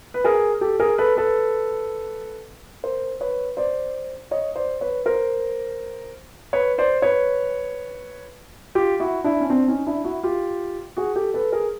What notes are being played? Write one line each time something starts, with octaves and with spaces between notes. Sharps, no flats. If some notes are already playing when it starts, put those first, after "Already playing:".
B4
G#4 A#4
G4 A4
G#4 A#4
A4 B4
A4 B4
A#4 C5
B4 C#5
C5 D5
C#5 D#5
C5 D5
B4 C#5
A#4 C5
B4 C#5
C5 D5
B4 C#5
F4 G4
E4 F#4
D4 E4
C#4
C4 D4
C#4 D#4
D4 E4
E4 F#4
F4 G4
F#4 G#4
G4 A4
A4 B4
G#4 A#4